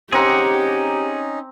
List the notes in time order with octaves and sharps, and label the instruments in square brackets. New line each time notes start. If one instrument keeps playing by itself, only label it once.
[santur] C4 A#5 D6 [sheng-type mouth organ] C#4 D#4 [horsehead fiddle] G4 [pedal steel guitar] G#4 F#5